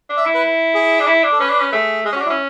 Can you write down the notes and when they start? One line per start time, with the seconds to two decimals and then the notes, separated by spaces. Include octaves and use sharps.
0.09 D4
0.17 E5
0.25 E4
0.34 B4
0.74 G#4
1.00 D4
1.07 E4
1.24 D4
1.32 A4
1.40 C#4 B4
1.50 D4
1.61 C#4
1.72 A3 G#4
2.05 G#3 G#4
2.12 C#4
2.15 F#4
2.21 D4
2.26 C#4 E4